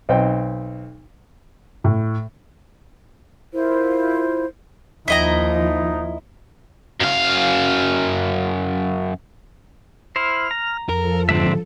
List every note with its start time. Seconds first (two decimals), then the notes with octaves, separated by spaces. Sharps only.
0.09 B1 C4 D#4 G5
1.84 A2
3.53 E4 F4 A#4 C5
5.08 D#2 F3 D#4 E4 D#5 A#5
7.01 F#2 F5
10.16 E4 C5 F6
10.51 A#5
10.89 F2 F3 A4 A#4
11.29 G#2 D3 C4 D4 E5